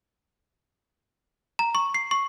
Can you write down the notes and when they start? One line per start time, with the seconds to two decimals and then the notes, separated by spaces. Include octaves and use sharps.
1.59 A#5
1.75 C#6
1.94 C7
2.11 C#6